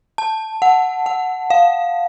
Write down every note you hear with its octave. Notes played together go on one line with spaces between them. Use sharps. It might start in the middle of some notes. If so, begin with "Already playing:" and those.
A5
F#5
F#5
F5